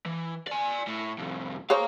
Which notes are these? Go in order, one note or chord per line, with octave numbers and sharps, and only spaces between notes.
E3
D5 G#5
A2
C2 F2
G#4 C5 C#5 F5 A#5